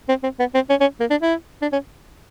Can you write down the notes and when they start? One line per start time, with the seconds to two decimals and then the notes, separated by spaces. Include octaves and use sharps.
0.09 C4
0.23 C4
0.39 B3
0.54 C4
0.70 C#4
0.80 C#4
1.00 A#3
1.10 D4
1.22 E4
1.62 D4
1.72 C#4